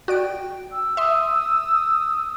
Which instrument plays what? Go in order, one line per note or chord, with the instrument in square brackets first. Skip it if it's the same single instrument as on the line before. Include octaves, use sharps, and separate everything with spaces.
[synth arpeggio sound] F#4 D5 D7 [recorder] G5
[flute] E6
[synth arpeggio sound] E5 C6 [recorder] D#6